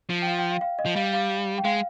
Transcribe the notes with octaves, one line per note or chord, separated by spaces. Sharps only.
F3
G5
F5
G5
F5
F5
D#5
F3
G3 F5
F5
G5
G#3 F5